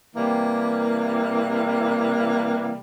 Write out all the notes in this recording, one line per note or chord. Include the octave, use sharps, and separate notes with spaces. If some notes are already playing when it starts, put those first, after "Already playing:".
C3 E3 G3 A#3